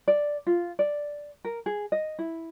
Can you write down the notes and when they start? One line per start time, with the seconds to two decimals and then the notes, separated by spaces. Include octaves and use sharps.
0.08 D5
0.47 F4
0.79 D5
1.45 A#4
1.66 G#4
1.92 D#5
2.19 E4